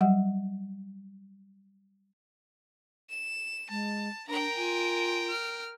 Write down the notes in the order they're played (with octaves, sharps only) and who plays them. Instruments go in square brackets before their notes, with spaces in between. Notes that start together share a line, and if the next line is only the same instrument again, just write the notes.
[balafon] F#3 G3 F#5
[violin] E7
[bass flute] G#3 [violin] A5
[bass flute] D4 [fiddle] A#4 G5 [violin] A#5
[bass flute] F4 [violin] G#5
[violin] F6